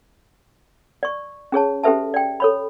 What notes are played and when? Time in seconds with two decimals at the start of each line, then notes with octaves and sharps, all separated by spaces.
1.03 D5 C#6
1.52 C#4 G#4 C#5 A5
1.84 C#4 G4 A4 B4 E5 A5
2.14 D5 G5
2.40 A4 C#5 B5